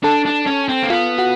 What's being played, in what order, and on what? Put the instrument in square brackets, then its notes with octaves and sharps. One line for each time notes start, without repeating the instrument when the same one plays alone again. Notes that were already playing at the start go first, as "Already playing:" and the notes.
[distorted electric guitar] D4 [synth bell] A4 A5
[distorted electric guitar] D4
C#4
C4
A#3
[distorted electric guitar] B3 [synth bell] F4 F5
[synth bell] F#4 F#5